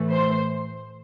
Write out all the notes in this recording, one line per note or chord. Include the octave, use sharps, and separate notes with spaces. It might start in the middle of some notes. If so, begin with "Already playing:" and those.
Already playing: A2 E3 A3
C5